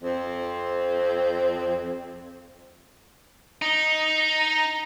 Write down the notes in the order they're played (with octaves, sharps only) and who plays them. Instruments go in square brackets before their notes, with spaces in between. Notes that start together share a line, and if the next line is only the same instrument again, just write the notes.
[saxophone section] F2 C4
[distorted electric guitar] D#4